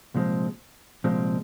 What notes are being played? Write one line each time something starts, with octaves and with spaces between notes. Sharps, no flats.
C2 A#2 F3 G#3 C4
C2 A#2 F3 G#3 C4